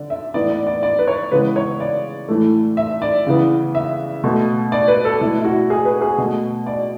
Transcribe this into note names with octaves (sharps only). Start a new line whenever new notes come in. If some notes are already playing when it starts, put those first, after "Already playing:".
Already playing: D3 D5
E5
A2 E3 B3 D5
D5
D5
D5
B4
C#5
C#3 E3 G#3 B3 B4
C#5
D5
A2 E3 A3
E5
D5
C#3 E3 B3
E5
B2 A3
D5
B4
A4
B2 A3 E4
E4
F#4
G#4
B4
G#4
B2 A3
D5